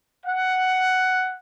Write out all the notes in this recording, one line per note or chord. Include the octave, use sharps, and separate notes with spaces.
F#5